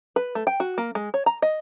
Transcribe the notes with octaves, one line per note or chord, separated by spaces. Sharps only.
B4
A3
G5
F#4
A#3
G#3
C#5
A#5
D#5